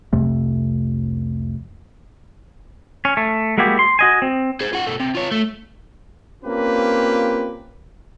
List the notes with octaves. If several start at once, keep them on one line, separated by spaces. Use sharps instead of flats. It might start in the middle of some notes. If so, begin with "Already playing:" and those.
C2 F2 C3 A3
C#4
A3
G#3 A#3 B3 E4 F#4 G4
C6
F#4 D#5 G#5
C4
G#4 C5
F4 F#5
B2 A3
C3
F4 C#5
A3
A#3 C4 C#4 F4 G4 B4